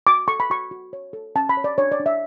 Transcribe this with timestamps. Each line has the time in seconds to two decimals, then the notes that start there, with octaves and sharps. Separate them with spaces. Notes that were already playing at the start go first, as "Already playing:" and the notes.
0.07 F#4 D6
0.28 A4 C#6
0.40 B5
0.50 F#4 C#6
0.71 F#4
0.93 C#5
1.13 A4
1.36 C#4 A5
1.49 B5
1.57 C#5
1.64 D5
1.78 D4 C#5
1.92 D5
2.00 D4
2.06 E5